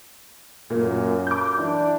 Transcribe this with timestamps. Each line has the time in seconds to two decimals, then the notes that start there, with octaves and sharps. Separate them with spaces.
0.70 F#2 A#2 A#3
1.27 D6 G6
1.58 E3 D4